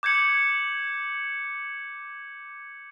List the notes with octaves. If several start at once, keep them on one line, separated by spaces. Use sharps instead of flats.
D6 G6 G#6 C#7 F#7